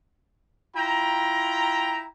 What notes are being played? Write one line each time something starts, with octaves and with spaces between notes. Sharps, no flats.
E4 F4 G5 A#5